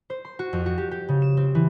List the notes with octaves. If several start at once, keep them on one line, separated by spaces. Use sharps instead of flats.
C5
C6
F#4
F2
F#4
G4
G4
C#3
E7
C4
E3